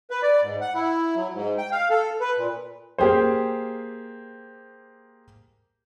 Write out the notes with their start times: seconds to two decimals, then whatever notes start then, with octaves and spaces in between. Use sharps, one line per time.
0.10 B4
0.23 D5
0.42 G#2
0.61 F#5
0.75 E4
1.16 F#3
1.33 G#2
1.58 G5
1.72 F5
1.90 A4
2.20 B4
2.38 A#2
2.98 A#3 G4 G#4 C5